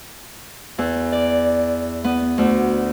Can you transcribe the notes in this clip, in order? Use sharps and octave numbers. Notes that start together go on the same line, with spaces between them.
E2
D5
B3
D2